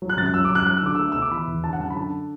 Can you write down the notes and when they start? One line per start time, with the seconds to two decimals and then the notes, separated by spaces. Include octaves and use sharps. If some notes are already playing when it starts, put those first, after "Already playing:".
0.02 F#3
0.10 F#6
0.17 F#2 A6
0.26 F#6
0.34 F#3 E6
0.45 D6
0.50 F#2
0.55 F#6
0.66 F#3 F#6
0.77 E6
0.82 D3 D6
0.95 A3 E6
1.12 B2 E6
1.22 D6
1.31 E3 B5
1.47 E2
1.64 D3 A5
1.73 F#5
1.80 F#2 A5
1.90 B5
1.96 D3 A5